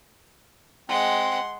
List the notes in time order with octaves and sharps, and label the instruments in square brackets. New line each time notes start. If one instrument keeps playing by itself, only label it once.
[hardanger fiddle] G#3 F#5 [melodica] C4 [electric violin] C6